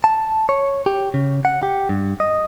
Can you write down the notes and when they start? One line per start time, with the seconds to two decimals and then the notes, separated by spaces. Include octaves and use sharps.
0.04 A5
0.49 C#5
0.86 G4
1.14 C#3
1.45 F#5
1.63 G4
1.89 G2
2.20 D#5